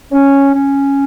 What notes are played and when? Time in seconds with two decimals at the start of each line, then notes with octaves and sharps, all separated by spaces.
0.12 C#4
0.55 C#4